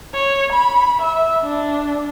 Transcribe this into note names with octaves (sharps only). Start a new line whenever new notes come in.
C#5
B5
E5
D4